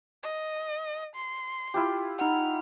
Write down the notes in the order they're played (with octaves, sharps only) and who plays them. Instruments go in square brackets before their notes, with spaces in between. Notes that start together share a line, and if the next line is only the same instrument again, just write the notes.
[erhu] D#5
C6
[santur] E4 F4 G4
[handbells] D#4 F#5 [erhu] F6